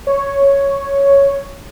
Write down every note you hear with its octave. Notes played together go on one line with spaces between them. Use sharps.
C#5